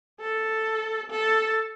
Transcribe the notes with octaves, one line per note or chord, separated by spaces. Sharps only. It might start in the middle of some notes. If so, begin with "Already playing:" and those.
A4
A4